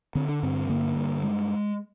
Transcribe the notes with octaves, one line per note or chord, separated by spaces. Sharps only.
D3 C4
D4
G2 C4
D3 A#3
G2
G#3